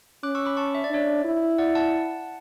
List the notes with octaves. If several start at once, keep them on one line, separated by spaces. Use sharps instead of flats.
C#4 D6 F#6
C#6 E6
B5 D6
A5 C#6
E5
D5
D4 C#5 E5
E4
D5 F#5
F#5 A5